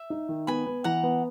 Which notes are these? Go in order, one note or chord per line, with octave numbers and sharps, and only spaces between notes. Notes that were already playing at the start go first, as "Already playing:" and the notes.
Already playing: E5
D#4
D#3
B3 G#5 B5
B3
E3 F#5 A#5
B3